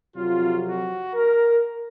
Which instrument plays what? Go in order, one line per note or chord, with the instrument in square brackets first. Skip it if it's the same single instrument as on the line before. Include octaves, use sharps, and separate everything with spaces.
[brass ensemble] F2 C3 F#3 F4
F#4
A#4